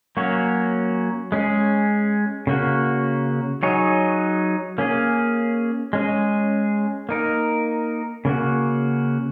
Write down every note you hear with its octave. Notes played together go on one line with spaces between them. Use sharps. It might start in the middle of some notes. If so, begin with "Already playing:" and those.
F#3 A#3 C#4 F#4 C#5
G#3 C#4 G#4
C#3 A#3 F#4
F#3 D#4 G#4 C#5
A#3 C#4 G#4
G#3 C#4 G#4
A#3 D#4 A#4
C#3 A#3 F#4